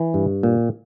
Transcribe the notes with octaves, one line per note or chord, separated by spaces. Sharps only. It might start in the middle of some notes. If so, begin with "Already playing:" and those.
Already playing: E3
G2
A#2